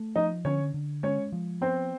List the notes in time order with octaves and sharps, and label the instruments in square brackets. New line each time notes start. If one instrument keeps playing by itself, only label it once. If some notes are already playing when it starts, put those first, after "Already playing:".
Already playing: [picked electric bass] A3
[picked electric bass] F3 [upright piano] D#4 D#5
[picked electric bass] D3 [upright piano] C#4 C#5
[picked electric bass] D3
[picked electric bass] G#3 [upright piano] C#4 C#5
[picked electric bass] F3
[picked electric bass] B3 [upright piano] C4 C5